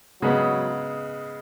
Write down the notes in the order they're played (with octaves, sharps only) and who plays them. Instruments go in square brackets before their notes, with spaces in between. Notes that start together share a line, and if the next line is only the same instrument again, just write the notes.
[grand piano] C#3 G#3 B3 [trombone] F#3